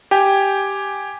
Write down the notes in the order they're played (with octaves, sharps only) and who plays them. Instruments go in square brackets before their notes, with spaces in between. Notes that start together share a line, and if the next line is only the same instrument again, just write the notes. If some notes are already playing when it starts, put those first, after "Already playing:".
[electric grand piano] G4 G5 G#5